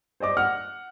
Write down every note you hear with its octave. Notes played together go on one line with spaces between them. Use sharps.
C5 D5 D#5 D6
F#5 F6